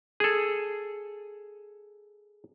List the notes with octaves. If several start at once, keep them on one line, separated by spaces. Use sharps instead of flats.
G#4 A4